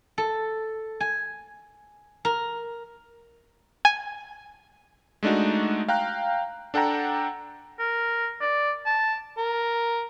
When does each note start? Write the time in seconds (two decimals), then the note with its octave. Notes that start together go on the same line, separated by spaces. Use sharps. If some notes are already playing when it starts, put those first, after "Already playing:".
0.18 A4
1.00 G#5
2.25 A#4
3.85 G#5
5.23 G#3 A3 D4 D#4 F#4
5.89 F5 G5 A#5 F#6
6.74 D4 A4 F#5 G5 A#5
7.79 A#4
8.41 D5
8.86 A5
9.38 A#4